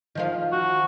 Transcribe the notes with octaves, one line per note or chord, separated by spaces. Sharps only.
D#3 F3 F5
F#4